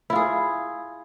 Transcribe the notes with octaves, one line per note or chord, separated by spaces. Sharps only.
E4 F4 G#4